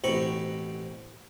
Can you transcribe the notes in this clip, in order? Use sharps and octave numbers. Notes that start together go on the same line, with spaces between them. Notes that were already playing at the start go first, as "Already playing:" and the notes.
A1 B2 C4 A#5 B5 C#6